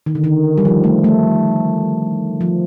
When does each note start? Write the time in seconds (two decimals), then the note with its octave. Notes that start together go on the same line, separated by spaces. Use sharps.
0.06 D#3
0.15 D3
0.24 D#3
0.58 G3
0.65 F3
0.84 A3
1.04 A3
2.41 F3